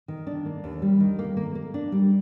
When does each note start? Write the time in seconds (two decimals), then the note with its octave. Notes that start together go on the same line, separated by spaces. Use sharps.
0.08 D#3
0.27 D4
0.45 A#3
0.64 D#2
0.82 G3
1.00 D#3
1.19 A#3
1.37 A#3
1.55 A#3
1.74 D4
1.92 G3